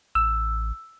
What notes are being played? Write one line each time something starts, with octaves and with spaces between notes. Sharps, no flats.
A1 E6